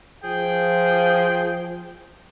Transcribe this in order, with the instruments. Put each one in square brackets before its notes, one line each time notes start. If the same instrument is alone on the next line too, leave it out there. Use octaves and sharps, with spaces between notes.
[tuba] F3 [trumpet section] G#4 G5